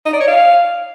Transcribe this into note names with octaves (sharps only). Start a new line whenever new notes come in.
D#5
D5
C#5
F5